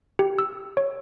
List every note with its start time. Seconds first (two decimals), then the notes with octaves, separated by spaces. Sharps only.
0.19 G4
0.39 E6
0.77 C#5